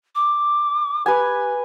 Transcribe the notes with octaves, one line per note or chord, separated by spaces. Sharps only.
D6
G4 B4 G#5